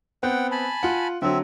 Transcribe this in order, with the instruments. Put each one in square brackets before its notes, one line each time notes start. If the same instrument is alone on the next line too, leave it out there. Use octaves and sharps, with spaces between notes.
[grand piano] B3 C4 [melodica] F#5 G5
[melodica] G#5 A5 B5
[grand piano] F4 F#5
[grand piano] D3 F#3 [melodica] C4 E5